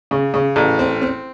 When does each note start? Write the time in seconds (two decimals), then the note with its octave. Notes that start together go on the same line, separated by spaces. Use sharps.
0.11 C#3
0.34 C#3
0.56 A1
0.79 C4
1.01 C4